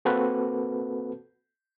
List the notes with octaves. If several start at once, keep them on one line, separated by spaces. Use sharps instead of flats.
A#3 C4 F#4 A4 B4